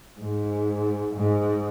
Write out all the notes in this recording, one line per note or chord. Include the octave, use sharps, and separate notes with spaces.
G#2
G#2